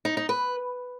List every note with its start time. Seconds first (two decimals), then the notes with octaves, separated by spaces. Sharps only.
0.05 D#4
0.17 D#4
0.29 B4